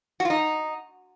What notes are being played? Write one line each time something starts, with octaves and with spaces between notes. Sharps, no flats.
F#4
F4
D#4